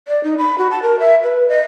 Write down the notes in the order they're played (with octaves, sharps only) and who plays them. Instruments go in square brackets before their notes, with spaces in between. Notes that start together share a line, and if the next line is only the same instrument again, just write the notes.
[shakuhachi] D5
D#4
B5
F#4
A5
A#4
E5
B4
D#5